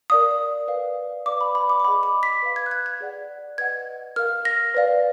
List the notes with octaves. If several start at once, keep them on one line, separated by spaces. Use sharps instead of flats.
A#4 D5 F5 D#6
B4 D5 F5
B4 D5 F5 D6
B5
B5
D6
D6
G#4 D#5 F#5 B5
D6
B6
B4 F5
G#6
F#6
G#6
G#6
G#4 D5 F#5
B4 D#5 F#5 G#6
A#4 F5 F6
A#6
B4 D5 F5